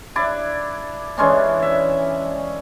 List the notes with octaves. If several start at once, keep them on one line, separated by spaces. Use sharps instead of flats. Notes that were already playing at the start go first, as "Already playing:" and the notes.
D4 E4 D5
E3 G#3 C#4 D4
E5